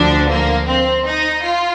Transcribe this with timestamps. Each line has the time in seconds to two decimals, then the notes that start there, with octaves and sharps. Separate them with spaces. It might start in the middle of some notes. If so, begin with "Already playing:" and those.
Already playing: D2 D3 F3 D4
0.29 A#3
0.68 C4
1.06 D#4
1.45 F4